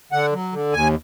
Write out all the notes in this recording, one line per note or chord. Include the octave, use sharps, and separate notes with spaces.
D3 F#5
F#3
D3
D#2 G#5